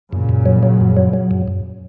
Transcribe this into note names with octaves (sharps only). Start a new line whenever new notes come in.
F#2 A#2 C#3
F#2
F#3
F#3
F#2
F#3
F#3
F#2
F#2